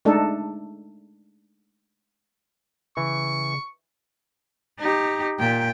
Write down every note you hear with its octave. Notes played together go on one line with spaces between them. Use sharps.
G#3 A3 D4 D#4 A4
C#3 E3 C#6
D#4 G4
A#2 G5